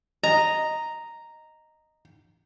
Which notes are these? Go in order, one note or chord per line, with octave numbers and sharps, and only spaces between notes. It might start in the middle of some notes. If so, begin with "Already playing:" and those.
D#5 A#5